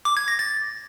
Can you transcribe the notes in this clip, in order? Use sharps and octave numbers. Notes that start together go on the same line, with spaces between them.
D6
G#6
A#6
A6